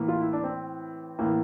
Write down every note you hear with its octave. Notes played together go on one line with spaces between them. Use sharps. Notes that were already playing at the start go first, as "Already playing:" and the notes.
Already playing: A2 E3 A#3
F4
E4
D4
C4
A2 E3 A#3